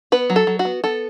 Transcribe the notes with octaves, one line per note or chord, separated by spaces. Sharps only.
B3 B4
F#3
A4
F#3
F#4
B3
B3 A4